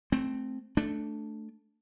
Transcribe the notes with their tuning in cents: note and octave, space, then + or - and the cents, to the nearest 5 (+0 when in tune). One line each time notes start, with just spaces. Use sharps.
A3 -15 C4 +0
A3 +0 D4 +0